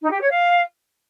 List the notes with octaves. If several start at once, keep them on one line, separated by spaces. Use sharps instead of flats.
D#4
G4
C#5
F5